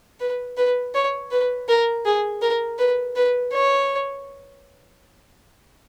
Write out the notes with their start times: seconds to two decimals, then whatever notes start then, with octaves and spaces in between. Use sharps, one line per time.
0.20 B4
0.57 B4
0.94 C#5
1.31 B4
1.68 A#4
2.05 G#4
2.42 A#4
2.79 B4
3.16 B4
3.52 C#5